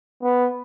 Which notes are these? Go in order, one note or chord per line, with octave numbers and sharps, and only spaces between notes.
B3